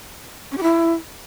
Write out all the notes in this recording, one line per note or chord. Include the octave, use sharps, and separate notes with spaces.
C#4
G4
E4